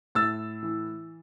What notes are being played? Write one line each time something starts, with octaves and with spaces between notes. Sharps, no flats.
A2 E6 A6
E3